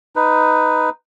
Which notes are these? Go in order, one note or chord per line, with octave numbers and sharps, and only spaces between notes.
D#4 B4